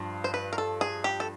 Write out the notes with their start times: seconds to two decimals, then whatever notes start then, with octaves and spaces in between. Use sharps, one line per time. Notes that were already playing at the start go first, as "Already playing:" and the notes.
Already playing: G2 F3
0.24 C5
0.34 B4
0.53 A#4
0.58 A4
0.81 G#4
1.04 G4
1.20 A4